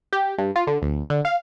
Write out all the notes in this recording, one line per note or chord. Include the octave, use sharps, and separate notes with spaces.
G4
G2
F4
D3
D2
D3
F5